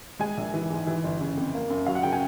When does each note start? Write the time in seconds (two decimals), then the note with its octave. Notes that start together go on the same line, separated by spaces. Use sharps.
0.19 G#3 G#5
0.37 A#1
0.54 E3
0.70 G#2
0.87 E3
1.04 G1
1.21 C#3
1.37 F2
1.55 A#3
1.70 F#2
1.86 F#3 F5
1.95 F#5
2.03 C#3 G5
2.12 G#5